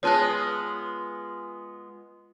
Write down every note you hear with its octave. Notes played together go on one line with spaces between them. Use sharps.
G#3 B3 F4 C#5 A5 F#6